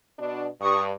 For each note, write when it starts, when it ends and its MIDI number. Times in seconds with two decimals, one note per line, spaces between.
0.19 0.47 47
0.19 0.47 62
0.60 0.92 43
0.60 0.82 85
0.60 0.82 87